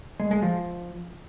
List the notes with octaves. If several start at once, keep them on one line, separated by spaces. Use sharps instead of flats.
G#3
G#3
F3